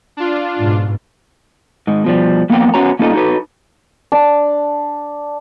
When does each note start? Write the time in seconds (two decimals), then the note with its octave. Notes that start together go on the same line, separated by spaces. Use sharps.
0.17 D4 F4
0.59 G#2 B2
1.87 G#2 D#3
2.04 B2 F3 G3
2.50 F2 A#3 B3 A#4 F#5 G5
2.74 B3 C#4 F#4 C#5 A#5
2.99 A#3 C#4 D#4 F4 A4 D#5
3.13 D#4 F#4 A4 B4
4.12 D4